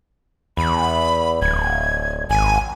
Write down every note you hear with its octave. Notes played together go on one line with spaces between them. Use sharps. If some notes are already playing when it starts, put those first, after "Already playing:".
E2 B5
D1 G#6
G#1 G#5